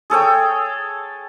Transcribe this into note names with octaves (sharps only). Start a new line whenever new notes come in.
G#4 A4 C#5 G5